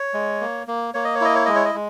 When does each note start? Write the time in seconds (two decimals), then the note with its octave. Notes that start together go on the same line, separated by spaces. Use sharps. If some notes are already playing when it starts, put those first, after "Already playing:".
Already playing: C#5
0.14 G#3
0.41 A#3
0.67 A#3
0.94 A#3 C#5
1.05 D#5
1.15 C#5
1.21 E4 D#5
1.35 C#5
1.46 G#3 D#5
1.55 C#5
1.65 D#5
1.74 G#3